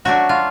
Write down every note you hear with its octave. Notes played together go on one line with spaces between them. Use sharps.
F#3 A3 D4 F#4
F4